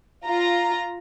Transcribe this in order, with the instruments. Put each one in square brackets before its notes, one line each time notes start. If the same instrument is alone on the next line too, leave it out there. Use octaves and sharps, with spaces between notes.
[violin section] F4 A#5